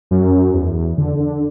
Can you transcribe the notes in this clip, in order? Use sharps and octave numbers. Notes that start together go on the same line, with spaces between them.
F#2
E2
D3
D3